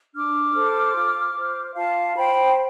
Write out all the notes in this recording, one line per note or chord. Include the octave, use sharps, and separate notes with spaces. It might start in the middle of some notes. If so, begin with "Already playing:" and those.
D4 D6 F6
A4 C5
F4
C5
F4 F5 A5
C5 G5 B5